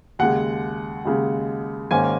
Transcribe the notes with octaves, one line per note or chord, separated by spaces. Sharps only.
D#2 C#3 G#3 F#5
D#2 C#3 G#3
G#2 D#3 A#3 C#4 G#5